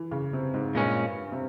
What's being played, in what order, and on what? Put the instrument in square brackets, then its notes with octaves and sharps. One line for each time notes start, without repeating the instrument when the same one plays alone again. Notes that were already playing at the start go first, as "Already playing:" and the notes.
Already playing: [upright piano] E3
C#3
C3
G#2
[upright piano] G2 [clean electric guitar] A#2 G#3 C#4
[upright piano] C3